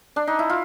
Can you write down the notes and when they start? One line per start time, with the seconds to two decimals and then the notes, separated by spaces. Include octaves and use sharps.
0.16 D4
0.27 D#4
0.39 E4
0.50 F4